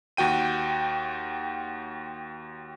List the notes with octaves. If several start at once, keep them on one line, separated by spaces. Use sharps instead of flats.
D#2 F#4 G5 D#7